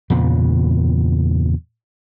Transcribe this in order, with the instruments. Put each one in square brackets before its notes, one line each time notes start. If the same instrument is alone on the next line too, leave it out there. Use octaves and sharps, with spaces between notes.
[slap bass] E2 G2 A#2 C#3